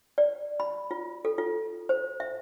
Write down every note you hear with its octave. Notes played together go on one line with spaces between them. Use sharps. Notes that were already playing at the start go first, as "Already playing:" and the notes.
D5
B5
F4
A4
F4
C5
E5